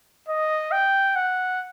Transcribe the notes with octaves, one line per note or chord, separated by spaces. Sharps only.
D#5
G5
F#5